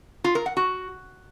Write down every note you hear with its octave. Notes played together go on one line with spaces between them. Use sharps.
F4
A#4
F#5
F#4